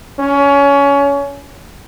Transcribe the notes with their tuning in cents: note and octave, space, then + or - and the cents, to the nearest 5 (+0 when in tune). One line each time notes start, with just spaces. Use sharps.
C#4 +25